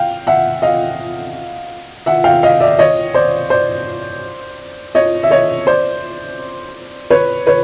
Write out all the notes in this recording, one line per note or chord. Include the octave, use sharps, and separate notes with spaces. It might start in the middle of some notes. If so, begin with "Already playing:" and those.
Already playing: F5 G5
E5 F#5
D#5 F5
E5 F#5
F5 G5
D#5 F5
D5 E5
C#5 D#5
C5 D5
C5 D5
C#5 D#5
E5
C#5 D#5
C5 D5
B4 C#5
B4 C#5